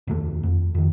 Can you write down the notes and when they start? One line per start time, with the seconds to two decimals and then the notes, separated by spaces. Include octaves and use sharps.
0.07 F1 D#2 A3
0.43 F2
0.74 F2 D#3